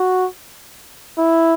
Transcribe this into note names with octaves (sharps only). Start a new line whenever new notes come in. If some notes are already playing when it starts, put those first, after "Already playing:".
Already playing: F#4
E4